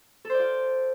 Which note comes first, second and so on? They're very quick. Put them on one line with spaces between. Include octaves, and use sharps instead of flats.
A4 C5 D5 F4